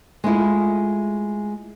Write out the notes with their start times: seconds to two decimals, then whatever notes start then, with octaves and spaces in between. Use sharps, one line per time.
0.24 G#3 A3 E4 F4